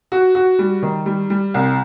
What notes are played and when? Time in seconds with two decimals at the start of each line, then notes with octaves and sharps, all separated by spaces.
0.12 F#4
0.35 F#4
0.59 G3
0.83 D#3
1.06 G3
1.30 G3
1.54 C2